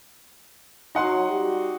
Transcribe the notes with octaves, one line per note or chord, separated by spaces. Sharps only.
F#3 D#4 F#5 C6
G3 F#4 G4